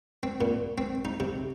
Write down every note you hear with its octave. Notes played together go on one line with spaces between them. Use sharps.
C4
A#2
C4
D#4
C3